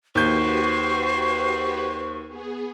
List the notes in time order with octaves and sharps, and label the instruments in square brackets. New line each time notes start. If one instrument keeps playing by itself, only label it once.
[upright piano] D#2 G6 [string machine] F#4 G4 B4 [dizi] C5 [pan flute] C#6
[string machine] B3 G#4